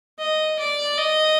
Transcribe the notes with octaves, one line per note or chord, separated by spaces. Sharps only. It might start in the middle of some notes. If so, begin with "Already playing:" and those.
D#5
D5
D#5